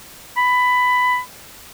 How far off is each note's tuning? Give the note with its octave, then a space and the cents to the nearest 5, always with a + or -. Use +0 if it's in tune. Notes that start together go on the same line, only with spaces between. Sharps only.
B5 +15